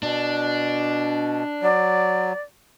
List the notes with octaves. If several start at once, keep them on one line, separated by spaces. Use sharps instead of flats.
B2 D4
F#3 D5